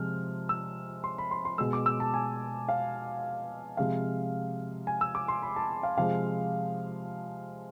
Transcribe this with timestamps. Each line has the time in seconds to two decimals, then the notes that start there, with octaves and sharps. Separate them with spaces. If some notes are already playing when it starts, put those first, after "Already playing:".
Already playing: C3 F3 G#3 F6
0.49 E6
1.04 C6
1.18 B5
1.31 C6
1.45 C6
1.58 B2 G#3 E6
1.73 D6
1.86 E6
2.00 A5
2.14 G#5
2.69 F5
3.77 C3 F3 G#3 F5
4.87 G#5
5.01 E6
5.15 D6
5.28 C6
5.42 B5
5.56 A5
5.83 F5
5.97 C3 F3 G#3 F5